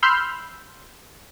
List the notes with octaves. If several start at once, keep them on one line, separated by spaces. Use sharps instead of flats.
B5 C6 E6 F6 G6